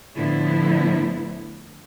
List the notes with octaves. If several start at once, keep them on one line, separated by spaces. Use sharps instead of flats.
A2 D3 F3 B3 E4